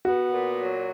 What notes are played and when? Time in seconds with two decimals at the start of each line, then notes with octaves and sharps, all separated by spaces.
0.05 B3 F#4
0.32 A#2
0.59 F#3